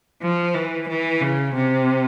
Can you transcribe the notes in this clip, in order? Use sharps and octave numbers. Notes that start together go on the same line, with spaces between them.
F3
E3
E3
C#3
C3